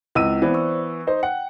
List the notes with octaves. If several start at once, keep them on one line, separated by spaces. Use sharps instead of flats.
C#2 C4 E4 F#5 E6 D#7
E3 B3 C5 D5
C#6 E6
D#4 C5
F#5 G5